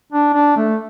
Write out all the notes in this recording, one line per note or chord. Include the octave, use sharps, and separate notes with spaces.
D4
D4
A3